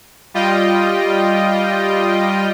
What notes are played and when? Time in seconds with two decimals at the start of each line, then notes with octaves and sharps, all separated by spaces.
0.34 G3 F4 D#5 G5